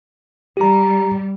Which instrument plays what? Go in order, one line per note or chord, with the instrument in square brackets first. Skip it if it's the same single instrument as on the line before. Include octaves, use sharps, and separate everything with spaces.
[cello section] G3 [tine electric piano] G4 A#5